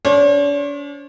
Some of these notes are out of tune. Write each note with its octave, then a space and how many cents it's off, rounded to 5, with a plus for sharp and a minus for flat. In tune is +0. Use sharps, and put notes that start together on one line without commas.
D4 -45 C5 +45